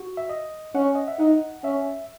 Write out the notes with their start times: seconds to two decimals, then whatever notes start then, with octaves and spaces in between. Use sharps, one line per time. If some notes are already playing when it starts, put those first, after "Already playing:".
Already playing: F#4
0.17 E5
0.30 D#5
0.74 C#4 F#5
0.95 D#5
1.08 E5
1.19 D#4 F#5
1.64 C#4 E5